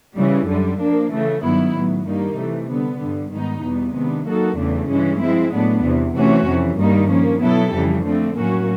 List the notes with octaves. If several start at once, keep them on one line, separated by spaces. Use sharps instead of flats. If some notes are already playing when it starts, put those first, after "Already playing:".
C#3 E3 G3
F#2 D3 G3
F3 A#3 D4
C#3 E3 A3
G2 D#3 F#3 B3 E4
A2 F#3 B3
G2 D#3 G3 A#3 D#4
C3 E3 A3
D3 G3 B3
G2 D3 G3
G#2 D#3 G3 B3 D#4
E2 B2 G3 B3
C3 D#3 G#3 B3 D4
F#3 A#3 D#4 F#4 A4
E2 C#3 E3 A3 D4
G2 E3 G#3 C#4
F3 G#3 C4 E4
A2 F#3 B3 D4
E2 C3 E3
C3 E3 A3 C#4 F#4
F2 C3 E3
G2 D#3 G3 A#3 D#4
F3 A#3 C#4
B2 F#3 B3 E4 A4
F2 C#3 E3 G3
D3 F3 A3 C4
A2 F#3 A#3 C#4 F#4